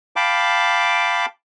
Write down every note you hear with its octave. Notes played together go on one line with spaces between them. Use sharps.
F5 G5 A5 B5 D6